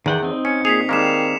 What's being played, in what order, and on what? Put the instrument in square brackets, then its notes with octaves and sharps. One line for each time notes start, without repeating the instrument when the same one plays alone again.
[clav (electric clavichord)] E2 [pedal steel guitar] D#3 F#5 G5
[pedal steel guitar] C4 D#4
[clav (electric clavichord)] C#4 [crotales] C#7
[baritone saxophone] A#2 [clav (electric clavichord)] G#4 [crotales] B6 C7 F7
[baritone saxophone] D#3 [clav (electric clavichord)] G3 G#3 A#3 [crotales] D6 E7